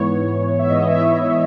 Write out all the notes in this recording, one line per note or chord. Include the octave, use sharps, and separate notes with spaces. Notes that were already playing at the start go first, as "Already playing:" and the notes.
Already playing: G#2 E3 B3 C#5
E5
G#2 E3 B3 D#5
E4 E5